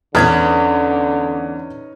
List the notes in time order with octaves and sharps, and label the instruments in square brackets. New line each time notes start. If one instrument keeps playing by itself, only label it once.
[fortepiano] E2 [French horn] D3 [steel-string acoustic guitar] C#4 D#4 B4 [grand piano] F6 G#6